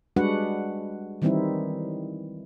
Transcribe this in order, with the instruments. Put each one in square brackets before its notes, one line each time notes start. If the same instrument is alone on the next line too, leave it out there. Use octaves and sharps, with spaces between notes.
[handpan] G3 G#3 D4 F#4 B4 F#5
D#3 E3 G3 C4 D#4 E4